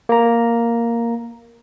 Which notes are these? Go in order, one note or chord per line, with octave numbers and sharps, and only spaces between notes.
A#3 A#5